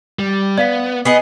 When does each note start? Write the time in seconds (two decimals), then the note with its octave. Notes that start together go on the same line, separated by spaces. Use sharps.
0.19 G3
0.58 B3 D5 F5 B6
1.05 B3 G#4 D#5